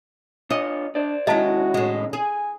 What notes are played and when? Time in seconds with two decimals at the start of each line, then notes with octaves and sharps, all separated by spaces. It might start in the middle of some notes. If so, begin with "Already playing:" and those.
0.50 D4 F4 C#5 D#5
0.95 D4 C5 D5
1.27 C3 D#3 G#3 C#4 E4 F#4 D#5 A5
1.74 A2 G#3
2.13 G#4 G#5